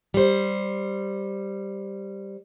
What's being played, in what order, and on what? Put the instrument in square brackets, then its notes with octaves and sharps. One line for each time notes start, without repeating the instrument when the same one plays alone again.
[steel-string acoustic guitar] G3 C5